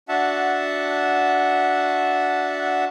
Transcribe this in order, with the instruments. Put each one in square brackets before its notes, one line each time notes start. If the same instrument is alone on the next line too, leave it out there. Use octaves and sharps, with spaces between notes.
[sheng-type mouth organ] D4 F#4 E5 F#5 A5